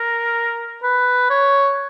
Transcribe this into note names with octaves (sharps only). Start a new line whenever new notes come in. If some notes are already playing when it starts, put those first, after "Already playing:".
Already playing: A#4
B4
C#5